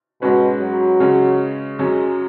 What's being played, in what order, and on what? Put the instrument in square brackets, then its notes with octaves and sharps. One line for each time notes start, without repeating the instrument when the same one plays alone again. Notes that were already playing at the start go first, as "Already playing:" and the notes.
[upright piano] G#2 G#3 C#4 F#4 B4 [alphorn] B2
[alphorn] F#3
[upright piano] C#3 G#3 C#4
[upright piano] F#2 F#3 C#4 [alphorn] G#3